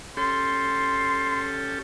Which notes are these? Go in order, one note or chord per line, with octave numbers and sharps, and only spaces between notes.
C#4 G4 A4 C6